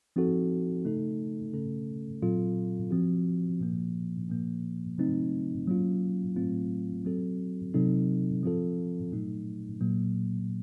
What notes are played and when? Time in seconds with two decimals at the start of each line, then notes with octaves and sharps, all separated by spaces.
0.16 F3 C4 D#4 F#4 A4
0.85 C#3 A3 D#4 A4
1.53 C#3 A3 C#4 A4
2.22 A#2 F#3 C4 F4 A4
2.91 F3 C4 F#4
3.60 A#2 F3 A#3
4.29 A#2 F3 A#3
4.98 C#3 F#3 A3 C4 D#4
5.67 F#3 A#3 C#4 F4
6.36 A2 F#3 A3 C4 F4
7.05 F#3 C4 F#4 A4
7.74 C3 F#3 C4 D#4 A4
8.43 F3 C4 F4 A4
9.12 A#2 F#3 A3 D#4
9.81 A#2 F#3 A#3